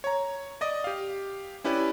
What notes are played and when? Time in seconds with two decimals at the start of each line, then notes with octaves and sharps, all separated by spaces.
0.04 C#5 A#5
0.61 D5 D#5 D#6
0.84 G4 F5
1.64 C#4 E4 G4 B4 D5